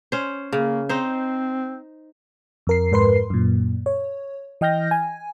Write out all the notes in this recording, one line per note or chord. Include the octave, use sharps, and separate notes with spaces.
C#4 C5
C#3 A#3
C4 D#4 C5
F2 A#4 C7
F2 G#2 A#4 B4 C6 C7
F#2 A#2
C#5
E3 D#5 G5 F6 G6 A#6
G#5